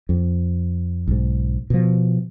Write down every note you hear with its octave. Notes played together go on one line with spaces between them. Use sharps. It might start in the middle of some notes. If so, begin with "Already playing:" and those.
F2
B1 G#2
B2 F3